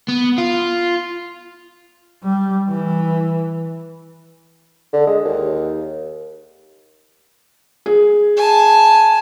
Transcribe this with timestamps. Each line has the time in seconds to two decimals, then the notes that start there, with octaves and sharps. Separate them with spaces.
0.08 B3
0.38 F4
2.24 G3
2.69 E3
4.93 D3
5.07 G#3
5.25 D#2
7.86 G#4
8.37 G#5 A5